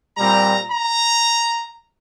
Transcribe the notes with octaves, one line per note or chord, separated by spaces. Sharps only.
A#2 G3 C4 A#5
A#5